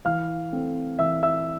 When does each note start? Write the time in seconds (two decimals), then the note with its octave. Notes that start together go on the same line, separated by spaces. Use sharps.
0.05 E3 F5 F6
0.53 A3 C4
0.99 E3 E5 E6
1.23 E5 E6